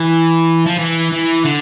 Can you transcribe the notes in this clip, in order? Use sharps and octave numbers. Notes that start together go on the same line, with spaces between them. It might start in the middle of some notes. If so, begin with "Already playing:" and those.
Already playing: E3
F3
E3
E3
D3